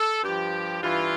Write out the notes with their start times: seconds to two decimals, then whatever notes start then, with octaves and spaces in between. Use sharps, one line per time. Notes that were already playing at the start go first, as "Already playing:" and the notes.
Already playing: A4
0.24 G2 F3 G4
0.82 G2 E3 F4